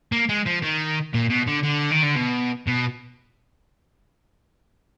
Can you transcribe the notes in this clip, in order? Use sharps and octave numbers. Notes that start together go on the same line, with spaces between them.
A#3
G#3
F3
D#3
A#2
B2
D3
D3
D#3
D3
B2
B2